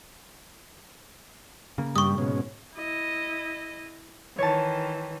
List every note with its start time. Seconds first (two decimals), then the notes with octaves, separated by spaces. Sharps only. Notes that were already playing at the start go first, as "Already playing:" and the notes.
1.78 C#3 A#3
1.96 G2 G3 C#6 D#6
2.18 G#2 B2 C#4
2.76 E4 D#5
4.38 D#3 E3 C#5 A5